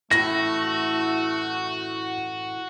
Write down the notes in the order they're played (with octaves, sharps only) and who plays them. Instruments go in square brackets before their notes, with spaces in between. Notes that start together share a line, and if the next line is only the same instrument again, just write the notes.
[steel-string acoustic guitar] F#2 A2 E3 [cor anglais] A3 [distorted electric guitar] F#4 [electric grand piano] A#6